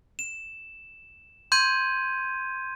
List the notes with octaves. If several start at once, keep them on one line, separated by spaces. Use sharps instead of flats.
E7
C6 G6 G#6 D#7